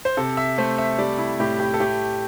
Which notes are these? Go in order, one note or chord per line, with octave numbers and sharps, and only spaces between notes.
C5
C3 A4
E5
A3 C5
E5
G3 D5
E4
A2 G4
G4
A4
A3 G4